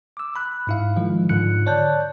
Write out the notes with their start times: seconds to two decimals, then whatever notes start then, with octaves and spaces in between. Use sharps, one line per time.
0.17 D6 E6
0.36 B5 F#6
0.67 G#2 E4 F5
0.96 D#3 F3 G#3 F4
1.29 G#2 D3 F4 F#6 C#7
1.66 C#5 D5 A5 F#6 G6